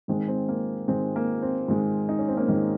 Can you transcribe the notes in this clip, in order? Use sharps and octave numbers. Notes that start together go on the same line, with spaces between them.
G#2 D#3 G#3 C4
C4
A#3
G#2 D#3 G#3 C4
A#3
C4
G#2 D#3 G#3
D#4
C#4
C4
A#3 C#4
G#2 D#3 G#3